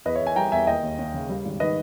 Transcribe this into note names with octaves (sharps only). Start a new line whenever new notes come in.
E2 B4 D#5
C#5 E5
E2
E5 G#5
G3 G5 A#5
E2 E5 G#5
D#2 D#5 G5
D#2
D#2
C#3
G3
G#1
D#3 B4 D#5